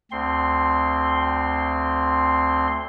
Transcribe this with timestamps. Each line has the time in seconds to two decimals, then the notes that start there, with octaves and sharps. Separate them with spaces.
0.12 D2 C4 C6